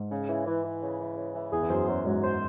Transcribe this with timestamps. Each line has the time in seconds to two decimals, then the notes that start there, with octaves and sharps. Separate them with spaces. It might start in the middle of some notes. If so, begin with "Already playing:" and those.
Already playing: G#2
0.11 C#3
0.29 E3
0.46 E3
0.64 E3
0.82 C#3
0.99 E3
1.17 C#3
1.35 E3
1.52 E2 G#4
1.63 E2
1.69 F#2 C5
1.88 F#2 F#3
2.05 G#2 F#3
2.22 C5